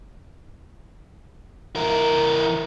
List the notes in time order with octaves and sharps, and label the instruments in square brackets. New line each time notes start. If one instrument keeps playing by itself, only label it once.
[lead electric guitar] E3 A#4